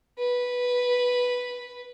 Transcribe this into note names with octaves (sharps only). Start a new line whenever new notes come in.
B4